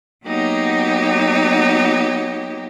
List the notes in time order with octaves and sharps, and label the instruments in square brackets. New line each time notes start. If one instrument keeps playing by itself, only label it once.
[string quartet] F#3 A#3 B3 D#4 G4 C#5